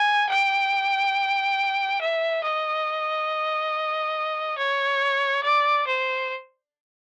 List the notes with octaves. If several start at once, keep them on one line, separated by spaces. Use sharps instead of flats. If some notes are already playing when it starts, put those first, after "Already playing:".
Already playing: G#5
G5
E5
D#5
C#5
D5
C5